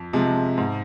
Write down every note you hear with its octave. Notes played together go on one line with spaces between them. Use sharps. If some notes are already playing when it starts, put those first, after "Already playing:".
Already playing: F2
C3 F3 G#3
G#2